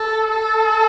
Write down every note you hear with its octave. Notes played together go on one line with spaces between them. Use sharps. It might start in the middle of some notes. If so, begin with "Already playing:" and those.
Already playing: A4
A4